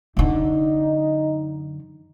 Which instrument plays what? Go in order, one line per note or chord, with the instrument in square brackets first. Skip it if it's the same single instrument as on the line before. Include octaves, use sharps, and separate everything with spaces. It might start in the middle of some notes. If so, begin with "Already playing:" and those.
[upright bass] F#2 D3 [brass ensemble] D#4